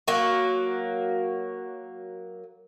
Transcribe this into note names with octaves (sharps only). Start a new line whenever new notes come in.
F#3 A#3 F#4